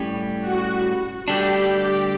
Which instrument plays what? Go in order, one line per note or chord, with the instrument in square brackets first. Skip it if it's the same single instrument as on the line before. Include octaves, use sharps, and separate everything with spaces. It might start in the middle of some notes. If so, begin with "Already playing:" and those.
Already playing: [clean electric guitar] A2 G3 C#4 G4
[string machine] F#4
[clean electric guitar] D2 D3 G3 D4 [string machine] G4